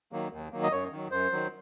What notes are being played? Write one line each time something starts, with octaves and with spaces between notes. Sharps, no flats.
D#3 F#3 A#3
D#2
D#3 F#3 A#3
D#5
F#2 C#5
D#3 F#3
F#2 C5
D#3 F#3